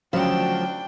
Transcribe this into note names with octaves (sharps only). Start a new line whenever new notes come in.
D2 C#3 F3 F#3 D4 G5 E7